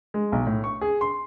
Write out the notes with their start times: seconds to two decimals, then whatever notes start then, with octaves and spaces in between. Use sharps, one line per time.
0.14 G#3
0.32 B1
0.47 A2
0.64 C#6
0.81 G#4
1.01 C6